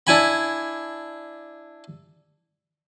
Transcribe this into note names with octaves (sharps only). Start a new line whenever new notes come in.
D4 E4 G#5 B5